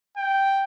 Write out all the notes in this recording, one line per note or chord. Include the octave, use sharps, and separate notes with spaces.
G5